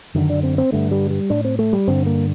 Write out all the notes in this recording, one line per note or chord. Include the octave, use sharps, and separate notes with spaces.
F#2 D3 D#3
D4
C4
C4
G2 D3 A3
G3
G3
A2 D4
C4
A3
G3
G2 D3 C4
A#3